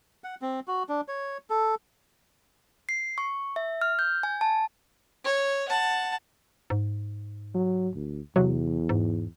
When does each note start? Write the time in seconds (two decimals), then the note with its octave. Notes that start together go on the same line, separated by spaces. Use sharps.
0.24 F#5
0.42 C4
0.68 F#4
0.89 D4
1.08 C#5
1.50 A4
2.89 C7
3.18 C#6
3.56 E5
3.81 F6
3.99 G6
4.23 G#5
4.41 A5
5.25 C#5
5.68 F#5 A5
6.70 G#2
7.55 F#3
7.95 D2
8.36 E2 C3 F#3
8.89 G#2